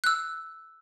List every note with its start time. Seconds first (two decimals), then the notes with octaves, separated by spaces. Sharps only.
0.04 E6 F#6